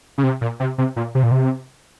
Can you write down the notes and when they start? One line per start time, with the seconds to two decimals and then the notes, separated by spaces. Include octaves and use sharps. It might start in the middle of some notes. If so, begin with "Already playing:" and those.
0.18 C#3
0.23 C3
0.41 A#2
0.60 C3
0.78 C3
0.96 A#2
1.15 C3
1.23 A#2
1.31 C3